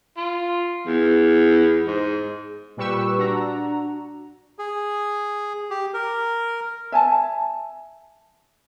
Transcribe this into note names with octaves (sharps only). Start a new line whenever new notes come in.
F4
E2
G#2
A#2 G3 G4 B4 C#6 E6
D4 F#4 A#5
G#4
G4
A#4
E5 G#5 A5